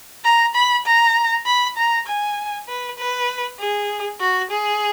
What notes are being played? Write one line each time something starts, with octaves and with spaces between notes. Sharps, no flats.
A#5
B5
A#5
B5
A#5
G#5
B4
B4
G#4
F#4
G#4